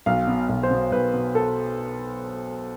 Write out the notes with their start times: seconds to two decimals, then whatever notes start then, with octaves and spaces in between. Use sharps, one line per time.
0.06 B1 F5
0.28 B2
0.49 B1
0.63 C5
0.71 B2
0.92 B1 B4
1.14 B2
1.35 A4